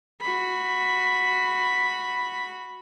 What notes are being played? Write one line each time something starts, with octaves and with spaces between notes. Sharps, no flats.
F#4 B5